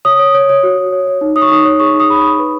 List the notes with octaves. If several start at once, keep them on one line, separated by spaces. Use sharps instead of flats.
C#5 D#6
C#5
C#5
C#5
F#4
C#5
C#5
C#5
D#4
C#5 D#6
C#6
D#4 D#6
C#6
C#5
G#4 C#6
D#4
D#6
G#4 B5
D#4 C#6
B4